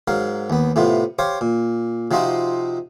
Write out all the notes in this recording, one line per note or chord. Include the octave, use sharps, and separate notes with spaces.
G#2 F#3 A#4 F5
D#2 B3
A2 C3 B3 F4
G4 C5 C#5 F5
A#2
C3 F3 C4 D#4 F4 F#4